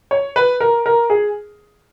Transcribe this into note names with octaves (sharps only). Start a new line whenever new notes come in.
C#5
B4
A#4
A#4
G#4